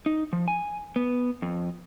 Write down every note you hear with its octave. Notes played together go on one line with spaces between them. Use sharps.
D#4
F3
G#5
B3
F2